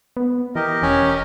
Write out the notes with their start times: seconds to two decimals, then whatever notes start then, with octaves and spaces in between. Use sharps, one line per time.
0.17 B3
0.55 E3 G4 A#4 D#5
0.82 E1 C#4